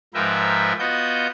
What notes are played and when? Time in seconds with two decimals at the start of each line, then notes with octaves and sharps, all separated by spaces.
0.14 G#2 F3 A#4 B4 E5 G5
0.79 B3 F4 F#4 D#5 G6